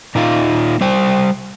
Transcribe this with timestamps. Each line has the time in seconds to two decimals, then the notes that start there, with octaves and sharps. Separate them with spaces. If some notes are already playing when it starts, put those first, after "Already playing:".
0.15 A#2 A#3 D#4 F4
0.81 G3 C5 G5